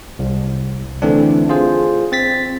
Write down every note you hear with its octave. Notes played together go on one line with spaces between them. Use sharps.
C2
D3 E3 A3 C4 D4
F4 G#4 C5
C4 A6 B6